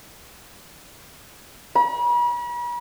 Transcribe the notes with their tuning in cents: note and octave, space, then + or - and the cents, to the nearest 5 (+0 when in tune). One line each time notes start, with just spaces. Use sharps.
B5 -45